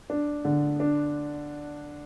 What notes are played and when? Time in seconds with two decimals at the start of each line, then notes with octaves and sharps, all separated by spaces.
0.10 D4
0.45 D3
0.80 D4